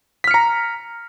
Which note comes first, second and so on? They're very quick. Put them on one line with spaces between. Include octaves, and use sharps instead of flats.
B6 F6 C#7 A#5